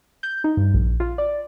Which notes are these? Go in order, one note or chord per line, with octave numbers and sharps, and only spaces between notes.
G6
D#4
G2
A#1
F4
D5